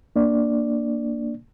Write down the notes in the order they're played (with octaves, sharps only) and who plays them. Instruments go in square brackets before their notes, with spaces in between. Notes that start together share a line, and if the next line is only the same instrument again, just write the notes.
[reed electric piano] A#3 D4 D5